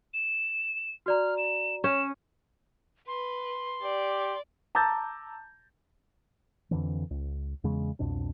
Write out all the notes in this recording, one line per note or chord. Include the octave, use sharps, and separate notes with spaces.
E7
F#4 D5 A#5 F6
E7
C#4 E7
B4 C6
G4 D5
A5 A#5 D6 E6 G6 A6
F2 D3 E3
C#2
E2 C#3 G#3
C2 F2 B2 D4